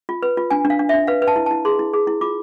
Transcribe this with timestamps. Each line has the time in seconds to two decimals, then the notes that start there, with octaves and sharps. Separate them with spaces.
0.09 F4
0.22 B4
0.37 F4
0.50 D4 G#5
0.65 D4
0.70 F5
0.79 D4
0.89 E5
0.94 D4
1.07 B4 F5
1.22 B4
1.28 A5
1.36 E4
1.46 A5
1.51 E4
1.65 G#4 C6
1.79 E4
1.93 G#4
2.07 E4
2.21 F4 D6